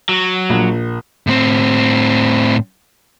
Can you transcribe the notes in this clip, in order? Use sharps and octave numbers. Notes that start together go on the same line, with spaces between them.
F#3
A#1
A2 C4